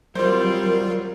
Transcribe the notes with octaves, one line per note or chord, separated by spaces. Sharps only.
F#3 G3 C4 F4 A#4 C5 D5 C6